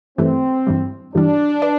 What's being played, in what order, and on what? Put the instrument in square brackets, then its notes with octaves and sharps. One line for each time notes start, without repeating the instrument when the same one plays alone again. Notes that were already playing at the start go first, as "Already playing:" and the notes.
[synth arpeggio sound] G2 E3 A3 [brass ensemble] C4
[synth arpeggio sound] G2 E3 G3
[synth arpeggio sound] G2 E3 G3 [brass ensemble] D4
[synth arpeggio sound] B4 D5